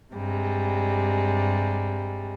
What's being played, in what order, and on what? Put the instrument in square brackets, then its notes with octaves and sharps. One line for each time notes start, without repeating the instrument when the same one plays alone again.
[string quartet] G2 C3 G3 G#3